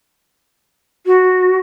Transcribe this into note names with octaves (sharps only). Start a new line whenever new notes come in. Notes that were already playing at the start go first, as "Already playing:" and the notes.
F#4